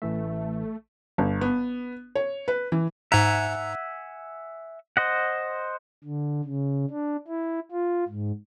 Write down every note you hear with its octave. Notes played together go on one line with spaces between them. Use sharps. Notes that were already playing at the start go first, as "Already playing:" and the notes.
A1 E3 A3 E5
G1
B3
C#5
B4
E3
G#2 E5 F#5 G#5 A#5
C5 D#5 F#5
D3
C#3
D4
E4
F4
G#2